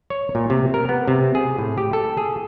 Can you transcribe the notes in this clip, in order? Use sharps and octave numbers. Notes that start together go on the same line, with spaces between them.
C#5
A#2
C3
A#4
B3
C3
G#4
A2
G4
A4
G#4